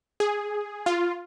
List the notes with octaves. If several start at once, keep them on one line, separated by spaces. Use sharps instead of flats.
G#4
F4